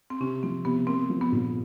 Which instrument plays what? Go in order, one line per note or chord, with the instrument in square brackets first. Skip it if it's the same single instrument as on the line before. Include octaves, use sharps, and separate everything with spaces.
[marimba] C4
[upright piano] C3 [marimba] C#4
[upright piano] F3 [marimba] C4
[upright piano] C3 [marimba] B3
[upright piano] A#3 [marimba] C4
[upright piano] F3
[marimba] B3
[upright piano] A#1